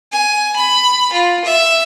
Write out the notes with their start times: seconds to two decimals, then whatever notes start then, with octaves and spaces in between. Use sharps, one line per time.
0.12 G#5
0.56 B5
1.12 F4
1.45 E5